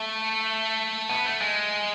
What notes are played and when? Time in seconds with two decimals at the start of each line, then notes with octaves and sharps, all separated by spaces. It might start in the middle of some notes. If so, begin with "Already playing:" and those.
Already playing: A3
1.09 B3
1.26 A3
1.41 G#3